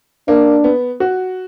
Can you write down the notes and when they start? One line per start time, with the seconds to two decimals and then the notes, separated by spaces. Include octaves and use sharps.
0.28 A#3 D4
0.64 B3
1.00 F#4